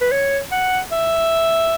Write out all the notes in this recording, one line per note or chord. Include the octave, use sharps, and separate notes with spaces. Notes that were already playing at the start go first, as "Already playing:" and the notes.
B4
C#5
F#5
E5